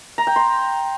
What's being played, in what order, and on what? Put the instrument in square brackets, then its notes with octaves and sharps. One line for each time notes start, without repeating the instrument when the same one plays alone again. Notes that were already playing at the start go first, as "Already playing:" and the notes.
[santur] A#5
G5
C6